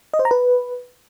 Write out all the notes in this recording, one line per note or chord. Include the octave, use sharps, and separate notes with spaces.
D#5
C5
A#5
B4